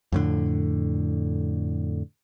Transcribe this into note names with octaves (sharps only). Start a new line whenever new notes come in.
F2 A2 D3